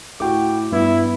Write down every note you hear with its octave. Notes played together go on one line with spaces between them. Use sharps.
A2 F#4 G5 D6
G2 B3 E4